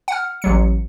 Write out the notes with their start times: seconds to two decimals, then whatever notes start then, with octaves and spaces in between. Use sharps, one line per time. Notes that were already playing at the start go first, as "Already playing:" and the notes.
0.08 F#5 F6
0.42 A1 F#3 C#7